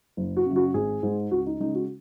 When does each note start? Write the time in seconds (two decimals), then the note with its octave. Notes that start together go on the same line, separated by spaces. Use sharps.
0.17 F#1
0.37 F#4
0.46 F#2 C#3
0.56 F#4
0.74 G#1 G#4
1.03 G#2 G#3
1.31 C#2 F#4
1.47 D#4
1.60 C#3 G#3 D#4
1.75 F#4